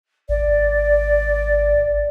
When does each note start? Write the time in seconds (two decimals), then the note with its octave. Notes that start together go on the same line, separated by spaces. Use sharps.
0.29 G#1 D5